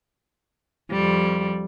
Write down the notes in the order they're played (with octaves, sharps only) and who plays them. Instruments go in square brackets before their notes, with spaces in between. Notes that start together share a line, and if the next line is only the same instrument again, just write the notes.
[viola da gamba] F2 G3